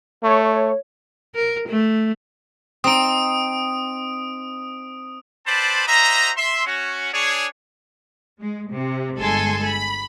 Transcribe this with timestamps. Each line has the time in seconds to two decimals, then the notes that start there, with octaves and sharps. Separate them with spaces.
0.23 A3 C#5
1.35 A#4
1.69 A3
2.84 C4 D#4 D#6 D7
5.46 C4 B4 C5 D5 A5 B5
5.87 F#4 C5 D#5 E5 A#5
6.36 E5 C6
6.66 C#4 F#4
7.12 D4 G#4 C#5
8.40 G#3
8.73 C3
9.19 G1 G#3 A4 G#5 C6 G#6
9.64 B5